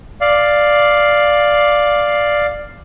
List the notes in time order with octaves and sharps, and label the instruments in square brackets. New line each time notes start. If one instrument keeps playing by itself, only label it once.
[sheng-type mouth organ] D5 F5